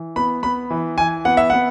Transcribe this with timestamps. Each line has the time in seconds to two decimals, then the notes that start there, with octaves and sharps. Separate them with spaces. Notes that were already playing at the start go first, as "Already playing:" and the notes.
Already playing: E3
0.16 B3 B5
0.43 B3 B5
0.70 E3
0.98 E3 G#5
1.25 B3 F#5
1.37 E5
1.50 B3 F#5